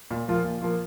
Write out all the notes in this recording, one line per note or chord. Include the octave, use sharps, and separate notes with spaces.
A#2
F3 A#3 F4
A#2
F3 A#3 F4